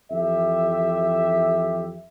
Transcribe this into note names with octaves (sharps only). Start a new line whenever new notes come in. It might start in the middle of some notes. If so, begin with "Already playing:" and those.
F2 E3 G4 E5